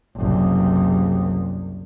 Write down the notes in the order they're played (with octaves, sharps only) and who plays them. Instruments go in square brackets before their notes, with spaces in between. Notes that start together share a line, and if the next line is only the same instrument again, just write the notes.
[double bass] F#1 C2